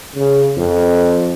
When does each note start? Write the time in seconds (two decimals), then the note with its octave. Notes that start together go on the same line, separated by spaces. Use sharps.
0.16 C#3
0.57 F2